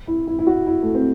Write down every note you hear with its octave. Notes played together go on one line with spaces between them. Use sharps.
E4
E4
E4
F#4
E4
A3
C4